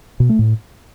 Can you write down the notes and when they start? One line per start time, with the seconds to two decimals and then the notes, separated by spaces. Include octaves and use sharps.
0.20 B2
0.29 A3
0.39 A2